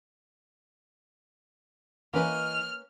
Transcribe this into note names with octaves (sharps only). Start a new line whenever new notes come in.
E3 A#3 C#4 B4 D#5 F6